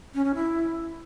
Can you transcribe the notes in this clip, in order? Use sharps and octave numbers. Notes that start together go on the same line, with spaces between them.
C#4
C#4
E4